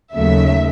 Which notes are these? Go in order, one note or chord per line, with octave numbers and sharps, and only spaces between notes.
D#2 C#3 F#3 A3 E5